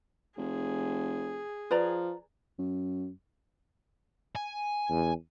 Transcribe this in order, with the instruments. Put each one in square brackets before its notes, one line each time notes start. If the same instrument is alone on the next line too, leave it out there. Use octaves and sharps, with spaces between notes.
[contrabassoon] F1 [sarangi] G#4
[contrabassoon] F3 [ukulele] B4 D5 A#5
[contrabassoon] F#2
[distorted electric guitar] G#5
[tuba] E2